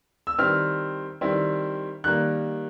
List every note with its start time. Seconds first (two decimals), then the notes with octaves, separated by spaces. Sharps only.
0.27 E6
0.38 D#3 G3 C4 E4 F6
1.21 D#3 G3 C4 E4
2.04 D#3 G3 A#3 F#6